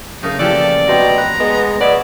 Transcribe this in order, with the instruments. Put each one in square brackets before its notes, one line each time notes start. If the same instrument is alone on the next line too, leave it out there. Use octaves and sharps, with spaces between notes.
[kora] C#3 A3 A#3 [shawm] D#4
[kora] E3 F3 G4 [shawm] A4 [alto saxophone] D5
[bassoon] B2 [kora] C4 C5 C#5 [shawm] A#5
[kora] B4
[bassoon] G#3 [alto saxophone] B3
[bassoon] B3 [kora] C#5 E5 [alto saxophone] D5